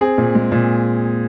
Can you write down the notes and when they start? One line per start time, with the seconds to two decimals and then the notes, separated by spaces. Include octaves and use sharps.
0.01 C4 G#4
0.18 A#2
0.35 G#3
0.52 A#2